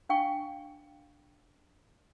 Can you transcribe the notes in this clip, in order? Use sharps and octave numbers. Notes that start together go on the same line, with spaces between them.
D4 F5 G5 C#6